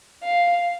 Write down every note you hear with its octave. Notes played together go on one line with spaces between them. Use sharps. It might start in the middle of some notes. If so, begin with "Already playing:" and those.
F5